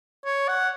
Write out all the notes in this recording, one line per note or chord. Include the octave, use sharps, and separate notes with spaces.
C#5
F#5